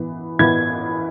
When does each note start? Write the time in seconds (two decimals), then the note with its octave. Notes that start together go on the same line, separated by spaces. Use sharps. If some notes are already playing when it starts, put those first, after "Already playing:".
Already playing: E3 B3
0.39 E3 B3 G#6